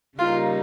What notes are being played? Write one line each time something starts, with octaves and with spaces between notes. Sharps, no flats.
C#3 G3 A#3 D#4 F4